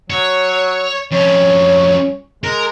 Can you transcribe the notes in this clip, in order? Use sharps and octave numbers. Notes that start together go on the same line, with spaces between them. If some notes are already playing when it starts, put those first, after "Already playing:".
F#3 C#5
F2 C#4 C#5
G#3 A#4